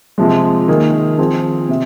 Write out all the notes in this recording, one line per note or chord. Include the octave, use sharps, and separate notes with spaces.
C3 F3 G#3
D#3 A#3 G#4
F3 C4 G#4
C3